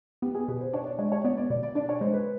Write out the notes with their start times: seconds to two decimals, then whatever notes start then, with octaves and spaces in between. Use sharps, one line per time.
0.22 B3 G4
0.35 G#4
0.48 B2 B4
0.61 C5
0.73 D4 C#5
0.86 D5
0.99 G#3 C#5
1.12 C#5
1.24 B3 D5
1.38 D5
1.50 B2 D5
1.63 D5
1.75 D4 D5
1.89 C#5
2.01 G#3 C5
2.14 B4